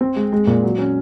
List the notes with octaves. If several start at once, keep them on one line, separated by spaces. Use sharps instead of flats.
C4
G#3
G#3
A#2
F#3
C#4